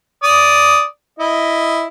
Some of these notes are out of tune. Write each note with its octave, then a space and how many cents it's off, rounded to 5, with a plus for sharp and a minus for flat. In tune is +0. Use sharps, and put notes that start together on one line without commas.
D5 -10 D#6 +0
E4 +0 D#5 +0